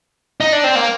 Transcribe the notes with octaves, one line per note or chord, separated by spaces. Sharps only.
D#4
D4
C4
A#3